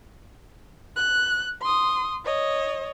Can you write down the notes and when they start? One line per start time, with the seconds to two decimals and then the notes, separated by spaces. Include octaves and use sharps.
0.96 F#6
1.62 C6 D#6
2.25 C#5 D#5